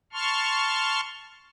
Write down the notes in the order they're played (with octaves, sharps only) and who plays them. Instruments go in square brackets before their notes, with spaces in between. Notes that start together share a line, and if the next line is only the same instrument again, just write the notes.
[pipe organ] A5 C6 C#6 F6